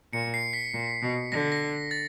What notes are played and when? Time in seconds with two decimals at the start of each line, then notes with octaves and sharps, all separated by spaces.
0.13 A#2 C#7
0.34 C7
0.53 B6
0.73 A#2
1.02 B2
1.32 D3 A#6
1.52 A#6
1.91 A6